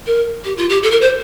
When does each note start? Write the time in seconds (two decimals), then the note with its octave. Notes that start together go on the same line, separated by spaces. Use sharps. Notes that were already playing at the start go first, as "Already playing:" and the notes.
0.07 A#4
0.45 G4
0.57 F4
0.69 G4
0.83 A4
0.91 A#4
1.01 C5